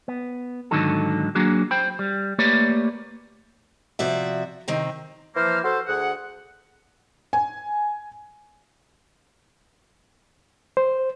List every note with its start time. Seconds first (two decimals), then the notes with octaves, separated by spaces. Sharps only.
0.08 B3
0.71 G#2 D3 D#3 F#3 D#4 A4
1.35 F#3 A#3 D4 F#4 G#4
1.71 C5 G5 B5
1.99 G3
2.39 A3 A#3 G4 B4 C#5 D5
3.99 C3 F3 F#4 D5 E5
4.68 C3 D#3 C4
5.36 E3 F3 A#3 C5 F6
5.64 F#4 A4 C5
5.87 D2 G#4 F#5
7.33 G#5
10.77 C5